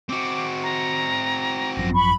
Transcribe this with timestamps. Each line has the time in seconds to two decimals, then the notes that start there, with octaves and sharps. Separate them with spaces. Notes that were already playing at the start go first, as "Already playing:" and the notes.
0.09 C4 F#4 D6
0.63 A#5
1.77 G#1 F#2 F3 A#6
1.94 B5 C#6